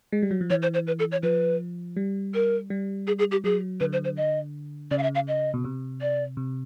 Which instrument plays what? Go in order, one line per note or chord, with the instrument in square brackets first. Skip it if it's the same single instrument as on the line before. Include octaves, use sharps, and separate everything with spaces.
[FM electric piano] G#3
G3
F#3
F3
[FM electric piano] E3 [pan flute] C#5
[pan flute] C5
C5
B4
A4
C#5
[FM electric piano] F3 [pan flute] B4
[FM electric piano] G3
[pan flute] A#4
[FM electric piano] G3
[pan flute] G#4
G#4
G4
[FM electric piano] F#3 [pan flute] G#4
[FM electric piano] D3 [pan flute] B4
[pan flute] C5
C5
D#5
[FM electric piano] C#3 [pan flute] D5
[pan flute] F5
E5
F5
D#5
[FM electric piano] B2
C3
[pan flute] D5
[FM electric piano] C3